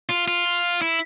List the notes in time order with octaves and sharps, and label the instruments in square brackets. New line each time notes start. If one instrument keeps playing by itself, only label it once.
[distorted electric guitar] F4
F4
E4